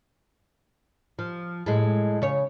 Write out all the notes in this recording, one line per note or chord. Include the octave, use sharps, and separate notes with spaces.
F3
A2 G#3
C#3 C#5